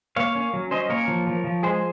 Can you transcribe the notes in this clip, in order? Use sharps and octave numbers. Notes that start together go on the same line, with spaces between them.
A#3 C#5 F5
C#4
F#3
C#4 C5 D#5
A#3 A#4 C#5
F3
F3
F3
G#3 G#4 C5